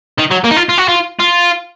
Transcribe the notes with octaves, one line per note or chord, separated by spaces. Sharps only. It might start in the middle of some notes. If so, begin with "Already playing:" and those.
D#3
F#3
A#3
D#4
F4
F4
F#4
F4
F4